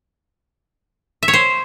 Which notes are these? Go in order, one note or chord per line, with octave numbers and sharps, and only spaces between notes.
E5
C#5
C5